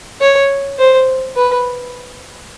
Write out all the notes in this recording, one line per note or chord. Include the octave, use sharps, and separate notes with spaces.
C#5
C5
B4